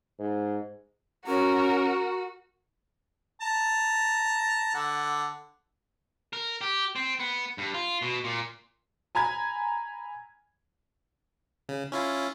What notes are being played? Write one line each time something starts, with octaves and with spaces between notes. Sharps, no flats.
G#2
C#4 F#4 A#4
A5 A#5
D3 F#5
A#4
G4
C4
B3
G2
F4
B2
A#2
G#5 A#5 B5 G#6
C#3
C#4 E4 F4